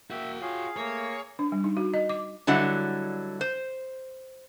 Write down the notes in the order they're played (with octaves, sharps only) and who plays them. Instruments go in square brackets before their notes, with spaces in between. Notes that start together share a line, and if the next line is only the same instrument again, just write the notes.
[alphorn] A#3 [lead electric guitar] F#4 G5 [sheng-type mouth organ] E5
[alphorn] F4 [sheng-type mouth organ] G#4 F5 [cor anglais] C#5
[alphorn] A3 [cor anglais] A#3 [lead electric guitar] C#5
[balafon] D4
G3
D#4
F#4
D#5
D6
[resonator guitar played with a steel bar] D3 F#3 G3 E4 D#5 F#5
C5